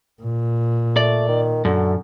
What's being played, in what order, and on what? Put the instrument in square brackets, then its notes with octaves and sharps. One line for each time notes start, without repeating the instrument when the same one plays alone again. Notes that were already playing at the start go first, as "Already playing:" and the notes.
[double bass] A#2
[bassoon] A3 [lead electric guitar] D5
[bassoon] D#3
[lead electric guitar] F#2 [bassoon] D3